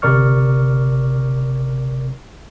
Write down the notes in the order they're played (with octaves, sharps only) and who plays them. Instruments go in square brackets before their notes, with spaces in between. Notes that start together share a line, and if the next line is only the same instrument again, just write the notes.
[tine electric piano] G1 C3 A#4 D5 C#6 F6